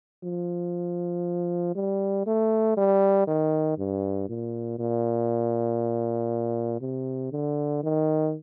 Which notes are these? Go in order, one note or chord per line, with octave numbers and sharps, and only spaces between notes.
F3
G3
A3
G3
D#3
G2
A#2
A#2
C3
D3
D#3